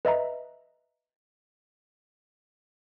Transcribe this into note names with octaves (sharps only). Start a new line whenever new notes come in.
B4 D#5 E5 A#5